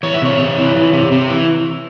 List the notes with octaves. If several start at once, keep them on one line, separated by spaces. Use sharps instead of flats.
E3 C#5
E5
C3 C#5
C3
E3
E3
C3
C3
E3